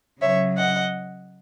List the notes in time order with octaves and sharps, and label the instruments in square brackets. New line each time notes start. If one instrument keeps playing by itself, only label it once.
[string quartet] C#3 F#3 C#5 E5
D#5 F#5